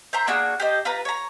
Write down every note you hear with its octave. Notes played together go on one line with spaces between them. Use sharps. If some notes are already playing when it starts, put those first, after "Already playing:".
C5 E5 A#5 C6
A#3 D4 F#4 G#4
G4 A4 C5 D#5
F4 B4 A#5
C#5 A#5